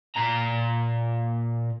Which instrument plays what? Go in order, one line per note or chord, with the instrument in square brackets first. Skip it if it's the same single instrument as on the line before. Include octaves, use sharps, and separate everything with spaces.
[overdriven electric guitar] A#2 A#5